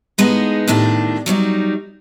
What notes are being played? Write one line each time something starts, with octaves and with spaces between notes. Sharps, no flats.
A2 G#3 B3 D#4 G#4
A2 D#3 D4 G4
F#3 G3 C#4 D#4